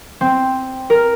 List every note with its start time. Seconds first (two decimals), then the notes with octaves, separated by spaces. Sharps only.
0.21 C4
0.90 A#4